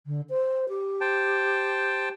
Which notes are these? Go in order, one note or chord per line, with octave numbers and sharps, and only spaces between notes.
D3
C5
G4
C5 G5 A5